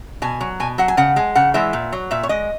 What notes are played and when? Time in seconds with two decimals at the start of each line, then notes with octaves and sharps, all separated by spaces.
0.22 B2 G#5
0.41 F#3
0.60 B2 G#5
0.78 F#3 F#5
0.88 G#5
0.97 C#3 F#5
1.16 G#3 G#5
1.35 C#3 F#5
1.54 E3 G#3 E5
1.73 A#2
1.92 F#3
2.11 A#2 E5
2.23 C#5
2.29 G#3 D#5